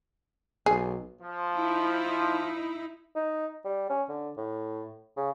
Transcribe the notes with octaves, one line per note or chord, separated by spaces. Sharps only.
B1 G#4
F3
D#4 E4
D#4
G3
C#4
D3
A2
C#3